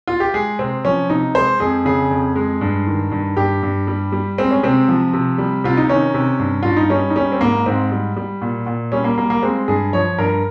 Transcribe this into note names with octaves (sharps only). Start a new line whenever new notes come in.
F4
G4
G#3 G#4
C3 C4
F3 C#4
C3 D#4
G#3 C5
F2 G#4
C#3 G#4
F2
G#3
G2
D#3
G2
G2 G4
G2
G3
G3
G#3 C4
C#4
C3 C4
F3
C3
G3
C3 F4
D#4
D#3 C#4
C3
G2
G2 F4
D#4
G3 C#4
D#4
G3 C#4
C4
G#2 A#3
G#2 C4
G3
G3
A#2
A#2
G3 C#4
A#3
G3 A#3
A#3
G#3 C4
G2 G#4
F3 C#5
G2 A#4